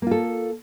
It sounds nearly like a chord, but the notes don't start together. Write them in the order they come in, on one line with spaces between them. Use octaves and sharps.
A#3 F4 A4